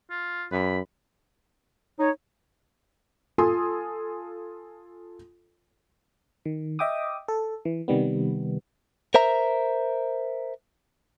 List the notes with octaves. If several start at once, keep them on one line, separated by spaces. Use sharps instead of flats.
F4
F#2 B5
D#4 C#5
F4 A4 G#5 C6 D#6
D#3
D#5 E5 G5 D6 D#6
A4
E3
C3 D#3 G3 B3
A#4 C5 E5 A#5